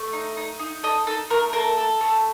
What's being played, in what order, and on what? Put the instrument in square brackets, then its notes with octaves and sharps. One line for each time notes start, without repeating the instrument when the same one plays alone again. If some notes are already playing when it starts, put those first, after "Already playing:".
Already playing: [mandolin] A3
D#4
D#4
D#4
A4 D#5
D#4 A4
A3 A#4
A4 A#4
A4
A3